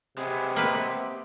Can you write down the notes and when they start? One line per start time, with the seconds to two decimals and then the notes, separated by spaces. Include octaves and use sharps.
0.17 C3 G#3 B3 G#4
0.56 A#3 C4 G4 B4